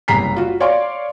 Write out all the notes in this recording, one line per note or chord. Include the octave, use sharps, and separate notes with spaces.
F#1 C2 A#5 B6 C7
F4 F#4
C#5 D5 F5 C6 C#6